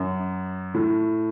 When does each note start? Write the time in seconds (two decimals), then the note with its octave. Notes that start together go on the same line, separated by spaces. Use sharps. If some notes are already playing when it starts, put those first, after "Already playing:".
Already playing: F#2
0.74 A2